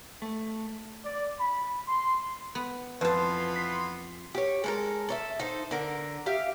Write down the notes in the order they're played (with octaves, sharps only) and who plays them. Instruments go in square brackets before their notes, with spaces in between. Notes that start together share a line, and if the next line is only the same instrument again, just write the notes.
[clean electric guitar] A3
[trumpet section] D5
B5
C6
[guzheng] B3
[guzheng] F2 A5 [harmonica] E3 F3 B3 [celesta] B4 [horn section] C6
[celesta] B6 C7
[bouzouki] G4 C#5
G#3 A4 A#4
A4 C#5 E5
D#4 A4 C5
D3 A#4
G4 E5 F5